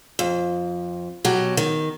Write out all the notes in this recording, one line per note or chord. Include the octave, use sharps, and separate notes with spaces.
F2
B2 F#3 G4
D#3